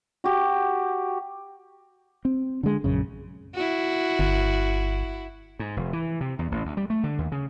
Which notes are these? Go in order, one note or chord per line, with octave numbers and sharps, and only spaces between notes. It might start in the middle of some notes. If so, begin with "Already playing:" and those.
F#4 G4
C4
D3 G#3
A#1 F#2 C#3
E4 F#4
G1
G#2
F1
E3
C3
E2
A1
D2
G3
A3
D3
D#2
C#3